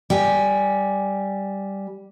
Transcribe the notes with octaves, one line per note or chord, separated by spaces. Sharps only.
G3 G5 G#5